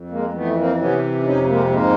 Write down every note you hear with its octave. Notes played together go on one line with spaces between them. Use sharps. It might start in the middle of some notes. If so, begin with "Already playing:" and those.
Already playing: F2
G#3 A#3
E3 A3 B3
A#3 C4
C3 B3 C#4
F2 C#4 D#4
G#3 A#3
G#2 G#3 A#3